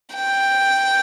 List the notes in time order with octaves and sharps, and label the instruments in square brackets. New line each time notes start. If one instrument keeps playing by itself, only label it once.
[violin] G5